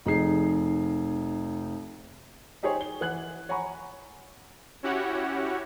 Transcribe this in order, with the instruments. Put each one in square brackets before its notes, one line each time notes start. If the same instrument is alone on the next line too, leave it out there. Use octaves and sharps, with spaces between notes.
[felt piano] F1 D#4 G#4 C7
[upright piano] D#4 G4 G#4 C5 C#5
G7
E3 F#5 F#6 G#6 F#7
C#5 F#5 G#5 A#5 B5 C#6
[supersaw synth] C#4 E4 F#4 G4 C#5 F#5